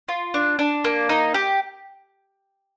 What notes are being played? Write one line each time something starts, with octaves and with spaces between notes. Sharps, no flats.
F4
D4
D4
A#3
D#4
G4